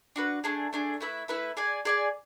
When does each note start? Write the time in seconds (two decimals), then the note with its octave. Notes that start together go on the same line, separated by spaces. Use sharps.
0.16 D4 F#4 B4
0.44 A3 D4 G#4
0.73 A3 D4 G#4
1.01 A3 E4 B4 E5
1.28 A3 E4 B4 E5
1.57 G#4 D5 G#5
1.85 G#4 D5 G#5